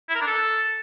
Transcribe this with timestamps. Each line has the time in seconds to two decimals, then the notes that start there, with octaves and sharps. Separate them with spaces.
0.09 E4
0.15 A#4
0.21 D4
0.27 A4